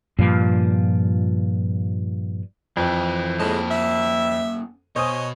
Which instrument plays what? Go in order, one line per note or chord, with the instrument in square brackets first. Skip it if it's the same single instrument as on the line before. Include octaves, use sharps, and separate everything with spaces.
[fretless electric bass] G2 A#2 F3
[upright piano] F2 [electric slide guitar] E3 F4 B4
[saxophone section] A2 G#3 [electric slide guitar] A#3 C#4 A5
[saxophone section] E5
[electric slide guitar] B2 [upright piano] C5 G#5 D#6 [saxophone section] C#5 D#5